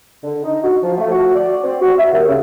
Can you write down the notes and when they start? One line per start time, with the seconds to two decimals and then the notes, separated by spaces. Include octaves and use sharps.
0.24 D3
0.44 D#4
0.63 F#4
0.82 F3
0.98 A3
1.10 F#4
1.35 D5
1.63 C4
1.81 F#4
1.98 E5
2.12 D#2
2.27 C#3